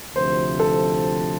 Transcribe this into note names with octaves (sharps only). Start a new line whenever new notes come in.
D2 C3 F3 C5
A4